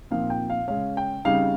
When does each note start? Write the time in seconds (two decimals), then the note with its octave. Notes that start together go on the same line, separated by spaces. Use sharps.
0.11 A#2 F3 C4 D#4 F5
0.30 G5
0.50 F5
0.68 C#3 G#3 C#4 F5
0.97 G5
1.25 C#3 G3 C4 D#4 F5